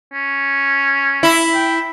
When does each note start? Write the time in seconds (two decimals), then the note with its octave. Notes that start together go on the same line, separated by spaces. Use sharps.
0.14 C#4
1.23 E4
1.54 G5